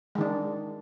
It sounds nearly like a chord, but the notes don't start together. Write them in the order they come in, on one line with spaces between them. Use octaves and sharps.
G#3 D#3 D4